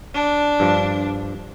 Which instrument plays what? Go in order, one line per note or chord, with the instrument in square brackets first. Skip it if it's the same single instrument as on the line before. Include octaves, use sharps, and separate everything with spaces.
[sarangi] D4
[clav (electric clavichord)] G2 F3